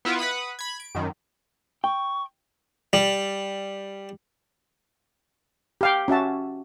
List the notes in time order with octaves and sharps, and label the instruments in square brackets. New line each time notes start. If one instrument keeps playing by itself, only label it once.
[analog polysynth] B3 E4 F4 B4
B4 F#5 B5 D#6
B5 G#6
D7
F#2 D#3
[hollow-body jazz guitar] G5 [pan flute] C#6
[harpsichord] G3
[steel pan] G4 F5 G5
C#4 F#4 E5 A5